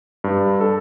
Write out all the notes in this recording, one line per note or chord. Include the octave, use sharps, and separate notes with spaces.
G2
A4